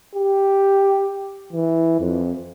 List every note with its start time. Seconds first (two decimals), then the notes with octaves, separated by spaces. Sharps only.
0.15 G4
1.53 E3
2.00 F2